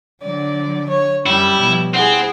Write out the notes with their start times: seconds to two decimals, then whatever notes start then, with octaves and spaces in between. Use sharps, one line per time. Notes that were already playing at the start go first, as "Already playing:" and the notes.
0.22 D3 F#3 D5
0.89 C#5
1.26 F#2 G3 E4
1.61 B2 F3
1.94 C4 E4 G#4 F#5